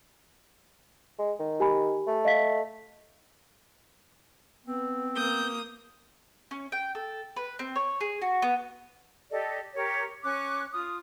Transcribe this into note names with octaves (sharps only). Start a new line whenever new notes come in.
G#3
D#3
G4 G#5 B5
A3
D#5 F5 B6
B3 C4
A#3 D#6 G6
C#4
G5
A4
B4
C4
C#5
G#4
F#4
B3
G4 A4 D5 D#5
G4 A#4 C#5
C#4 C#6 D6 F#6
F4 D#6